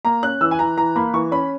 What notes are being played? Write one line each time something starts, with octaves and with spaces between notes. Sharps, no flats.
A#3 A#5
C#4 F#6
E3 E6
G#5
E3 A#5
E3 A#5
A#3 B5
E3 C#6
C#4 B5